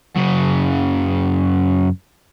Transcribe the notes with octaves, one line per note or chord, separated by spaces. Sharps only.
F#2 C#3